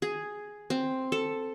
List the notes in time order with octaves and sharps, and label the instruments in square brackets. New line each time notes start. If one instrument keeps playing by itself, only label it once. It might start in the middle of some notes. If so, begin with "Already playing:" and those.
[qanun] G#4
C4
A4